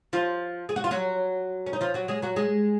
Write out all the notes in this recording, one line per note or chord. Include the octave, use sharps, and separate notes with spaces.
F3 F4
G#4
F#4
F4
F#3 F#4
C#4
D#4
F3 F4
F#3 F#4
G#3 G#4
F#3 F#4
G#3 G#4